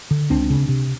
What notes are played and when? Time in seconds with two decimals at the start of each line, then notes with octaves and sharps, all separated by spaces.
0.11 D3
0.30 C#2 C4 D4
0.50 C#3
0.69 C3